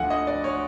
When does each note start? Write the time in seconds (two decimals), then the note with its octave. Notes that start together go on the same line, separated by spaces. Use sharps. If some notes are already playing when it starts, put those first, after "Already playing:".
Already playing: D2 D3 F3 F#5 G#5
0.10 D#5
0.27 D5
0.44 C#5